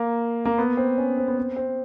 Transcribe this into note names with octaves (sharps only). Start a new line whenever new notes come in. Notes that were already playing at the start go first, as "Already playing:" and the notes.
Already playing: A#3
A#3
B3
C4
C#4
C4
B3
C4
C4